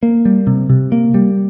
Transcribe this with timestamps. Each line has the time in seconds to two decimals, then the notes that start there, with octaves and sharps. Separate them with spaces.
0.03 A#3
0.25 G3
0.47 C3
0.69 C3
0.92 A#3
1.14 G3